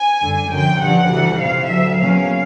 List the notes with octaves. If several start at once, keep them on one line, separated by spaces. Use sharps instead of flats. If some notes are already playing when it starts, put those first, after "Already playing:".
Already playing: G#5
F#2 D3 G3
F#2 D3 F3 G5
G2 D3 F3 F#5
D2 C#3 E3 G3
F2 C3 E3 F5
D2 D3 F#3 E5
E2 C#3 F#3 A#3 C#4 F5